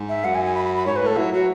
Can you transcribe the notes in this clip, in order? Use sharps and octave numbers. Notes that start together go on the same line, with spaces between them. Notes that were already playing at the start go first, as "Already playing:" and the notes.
Already playing: G#2
E5
F#2 F#5
G#5
G#5
B5
B5
B5
G#2 C#5
B4
A2 A4
F#3 E4
F#3 F#4